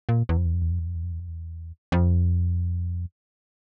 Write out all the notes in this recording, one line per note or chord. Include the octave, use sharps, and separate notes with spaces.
A#2
E2
F2
E2
F2
E2
F2
E2
F2
E2
F2
E2
F2
E2
F2